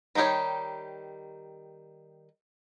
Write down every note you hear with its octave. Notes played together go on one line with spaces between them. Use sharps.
D#3 G3 D#4 G4 C#5